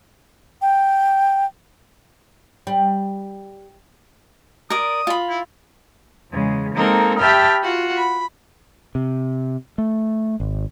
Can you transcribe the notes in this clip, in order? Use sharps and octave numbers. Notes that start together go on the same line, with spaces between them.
G5
G3
A#4 D5 D#6
F4 B5
E4
E2 C#3 G#3
G#3 A#3 C4 D#4 A4 A#4
G4 E5 G5 A5 B5 F6
F4 F#4 F#5
B5
C3
A3
G#1